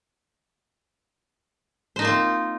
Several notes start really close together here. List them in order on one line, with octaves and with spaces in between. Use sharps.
C5 D#4 A#3 F4 C4